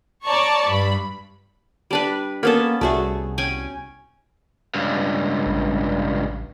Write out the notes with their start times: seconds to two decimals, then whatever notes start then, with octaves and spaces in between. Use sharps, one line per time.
0.25 C#5 D5 A5 A#5 C#6
0.66 G2 B5
1.91 G3 D4 B4
2.43 A#3 B3 C#4 A4
2.81 C2 A3 F#4 G#4
3.38 C#4 G5 G#5
4.75 C#2 G2
5.46 A1